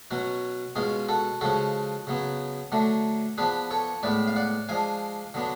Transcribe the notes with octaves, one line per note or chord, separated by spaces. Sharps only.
B2 F#3 C#4 F#4
B2 G#3 C#4 F4 G#4
F#4 A4
C#3 F3 G#3 C#4 F#4 A4
C#3 F#3 B3
D3 F#3 A3 D4
F3 B3 D4 G#4 B4
A4 C#5
A2 G#3 B3 B4 D5
F5
D5 F#5
F3 G#3 D4 F5 G#5
D3 F#3 B3 D4